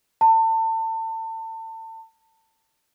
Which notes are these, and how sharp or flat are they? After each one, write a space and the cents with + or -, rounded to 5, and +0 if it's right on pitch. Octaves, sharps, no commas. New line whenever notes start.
A5 +30